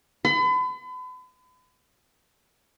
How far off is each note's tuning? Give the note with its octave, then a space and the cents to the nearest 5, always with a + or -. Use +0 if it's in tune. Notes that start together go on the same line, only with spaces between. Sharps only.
B5 +40